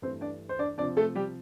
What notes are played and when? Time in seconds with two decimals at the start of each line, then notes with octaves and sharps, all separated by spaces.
0.02 G2 E3 A3 C4 C5
0.21 D4 D5
0.49 C5
0.59 D4 D5
0.78 C3 F3 C4 D4 D5
0.97 A3 A4
1.15 G3 G4